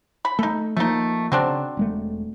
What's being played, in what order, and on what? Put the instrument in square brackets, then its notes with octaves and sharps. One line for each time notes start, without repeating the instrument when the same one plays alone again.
[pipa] B5
[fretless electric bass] A3 [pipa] D#4 A4
[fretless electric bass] F3 A#3 [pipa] A3 D#4
[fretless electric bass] C#3 [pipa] F#3 C4 D4
[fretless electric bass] E1 G#3 A3